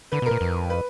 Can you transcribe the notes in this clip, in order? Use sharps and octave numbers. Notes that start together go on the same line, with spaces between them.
D3 B4
B2
A#4
A#2
F2
B4